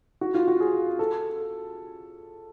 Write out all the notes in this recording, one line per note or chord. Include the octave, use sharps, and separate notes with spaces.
F#4
F4
F#4
G#4
A4